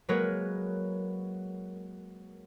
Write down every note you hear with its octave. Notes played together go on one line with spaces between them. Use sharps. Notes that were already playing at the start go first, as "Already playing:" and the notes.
F#3 G#3 A#3 A#4 B4 C#5